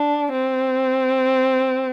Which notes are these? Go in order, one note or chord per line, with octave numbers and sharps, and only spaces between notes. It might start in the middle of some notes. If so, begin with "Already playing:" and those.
Already playing: D4
C4